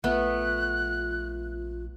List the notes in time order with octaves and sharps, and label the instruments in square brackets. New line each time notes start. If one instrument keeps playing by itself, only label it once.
[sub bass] A#1 [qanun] A3 B3 [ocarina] F4 [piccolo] F#6